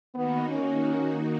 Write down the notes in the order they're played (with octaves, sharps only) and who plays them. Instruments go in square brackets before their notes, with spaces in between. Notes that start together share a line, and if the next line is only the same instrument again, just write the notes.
[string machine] D#3 A#3 D#4 F#4 [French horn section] B3
[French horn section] C#4